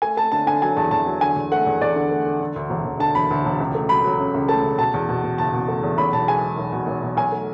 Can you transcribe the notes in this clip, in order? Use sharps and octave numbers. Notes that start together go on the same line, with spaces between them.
A3 G#5
A3 A5
D3 A5
D3 G#5
F#3 G#5
E2 A5
E2 A5
F#3
D3 G#5
E2
A3 F#5
E2
E2 D5
D3
A3
D3
D3
D2
E1
E1
D3 A5
E1 B5
D2
E1
C#2
A3
F#3 B5
F#3
C#3
C#2
A3 A5
C#3
B2 A5
E2
B2
B2
F#1 A5
B2
A3
E2
B1 B5
B2 A5
G#3 G#5
G#3
B1
B2
B1
B1
B1 G#5
A3